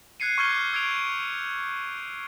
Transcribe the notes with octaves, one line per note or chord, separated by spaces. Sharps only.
F#6 G#6 C7 C#7 D#7
C#6 D6 F6 G6 G#6 G7
E6 G#6 C7 D7 F7